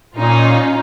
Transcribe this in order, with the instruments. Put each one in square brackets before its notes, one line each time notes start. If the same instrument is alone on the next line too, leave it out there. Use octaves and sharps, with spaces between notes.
[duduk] A#2 [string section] C#4 D#4 F4